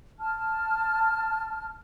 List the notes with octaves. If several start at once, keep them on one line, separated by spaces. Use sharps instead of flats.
A5 F6